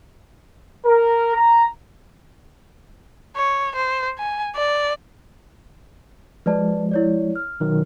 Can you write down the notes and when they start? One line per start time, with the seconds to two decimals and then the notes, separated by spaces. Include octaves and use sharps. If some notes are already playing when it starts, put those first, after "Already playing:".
0.85 A#4
1.35 A#5
3.36 C#5
3.76 C5
4.19 G#5
4.56 D5
6.46 F3 G#3 B4 D5 A5
6.91 E4 C#5 D5
7.36 F6
7.60 B2 D#3 F#3